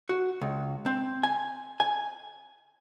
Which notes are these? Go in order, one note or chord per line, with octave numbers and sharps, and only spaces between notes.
F#4
C#2
C4
G#5
G#5